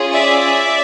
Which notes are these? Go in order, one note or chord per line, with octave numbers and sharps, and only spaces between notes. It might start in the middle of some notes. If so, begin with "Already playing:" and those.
Already playing: C#4 F4 G#4
D5 E5